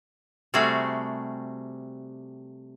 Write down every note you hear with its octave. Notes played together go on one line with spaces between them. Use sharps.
C3 G3 A3 F#4 G#4 F5